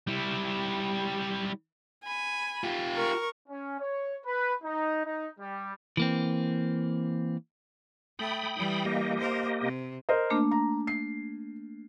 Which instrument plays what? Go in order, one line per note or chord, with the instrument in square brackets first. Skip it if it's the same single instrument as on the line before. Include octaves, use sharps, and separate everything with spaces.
[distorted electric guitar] G3 E4
[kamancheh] G#5 B5
[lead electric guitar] F4 G4
[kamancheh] A#4 C#6
[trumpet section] C#4
C#5
B4
D#4
D#4
G3
[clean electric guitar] E3 A#3 C4
[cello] A3 [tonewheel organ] G5 B5 D#6
[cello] E3 G3
[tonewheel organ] A#3 G4 D#5
[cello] A#4 C5
C3
[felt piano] A#4 C5 D#5
[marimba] A3 A#3 D4
[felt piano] A#5
C7